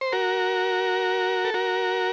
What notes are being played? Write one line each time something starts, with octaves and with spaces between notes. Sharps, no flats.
C5
F#4 A#4
A4
F#4 A#4